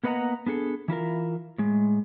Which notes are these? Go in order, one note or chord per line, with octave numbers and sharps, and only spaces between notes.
A#3 B3 B4 D#5 F#5 A#5
B3 D4 G#4 A4
E3 E4 F4 A#4
A2 G#3